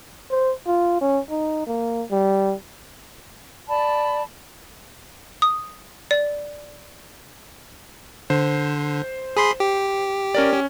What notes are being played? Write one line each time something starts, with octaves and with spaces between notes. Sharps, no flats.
C5
F4
C#4
D#4
A#3
G3
D5 A5 B5
D#6
D5
D3 C5
G#4 B5 C6
G4
C#4 A#4 D5
C#4